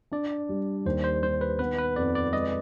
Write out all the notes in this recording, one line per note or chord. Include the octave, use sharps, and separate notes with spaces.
D4 D5
G3
D#2 C5
C5
D#3 C5
B4
B3 B4
B4
F2 D5
D5
G#3 D#5